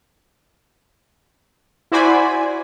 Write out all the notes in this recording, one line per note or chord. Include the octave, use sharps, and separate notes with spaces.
E4 F#4 C5 D5 G#5 B5